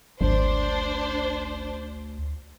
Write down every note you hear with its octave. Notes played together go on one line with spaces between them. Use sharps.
G#1 D2 D4 C5